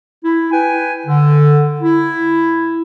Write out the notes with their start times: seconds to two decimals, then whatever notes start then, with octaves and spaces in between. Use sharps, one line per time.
0.24 E4
0.51 B4 G5 G#5
1.06 D3
1.81 E4